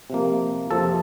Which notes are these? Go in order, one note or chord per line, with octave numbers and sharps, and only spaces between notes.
C3 F3 A#3
F2 C3 F3 A4